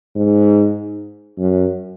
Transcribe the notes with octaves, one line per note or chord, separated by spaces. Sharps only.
G#2
F#2